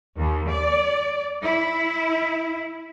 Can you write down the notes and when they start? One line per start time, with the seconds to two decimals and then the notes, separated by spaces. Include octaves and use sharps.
0.18 D#2
0.49 D5
1.43 E4